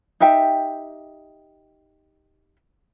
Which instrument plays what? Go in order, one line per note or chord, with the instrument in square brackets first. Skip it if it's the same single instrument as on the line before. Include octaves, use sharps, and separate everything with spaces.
[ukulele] D#4 G4 E5 G5